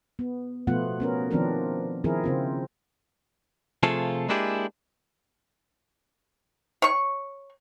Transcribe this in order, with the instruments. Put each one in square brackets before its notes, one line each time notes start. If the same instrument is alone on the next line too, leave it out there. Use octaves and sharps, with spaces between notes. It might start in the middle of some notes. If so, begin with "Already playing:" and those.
[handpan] B3
B2 F3 A3 B3 F4 F#5
B3 C#4 A#4
D#3 F3 B3 C4 D4 A#4
D#3 F3 C4 E4 G#4 A#4
C#3 C4 F4
[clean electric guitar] C3 F3 A3 F4 G#4 A4
G#3 A#3 D4 E4 G4 G#4
[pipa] C#5 C#6